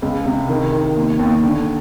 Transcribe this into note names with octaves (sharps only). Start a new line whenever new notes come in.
C#2
C3
D#3
D#3
D#2
D#2
D3